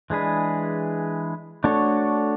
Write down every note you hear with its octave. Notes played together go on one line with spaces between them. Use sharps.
E3 G#3 D4 G#4 B4
A3 D4 F#4 A4 C#5